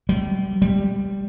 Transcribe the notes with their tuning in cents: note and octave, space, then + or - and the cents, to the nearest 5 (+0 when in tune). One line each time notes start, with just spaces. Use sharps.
G3 -30
G3 +5